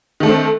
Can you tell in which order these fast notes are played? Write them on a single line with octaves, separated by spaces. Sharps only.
D#3 A3 D4 C4